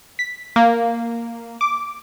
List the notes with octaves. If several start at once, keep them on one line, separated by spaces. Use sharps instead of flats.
B6
A#3
D6